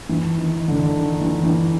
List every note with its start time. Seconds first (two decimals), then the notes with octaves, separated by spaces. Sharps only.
0.09 E3
0.38 D#3
0.68 D3
0.98 D#3
1.21 E3
1.43 E3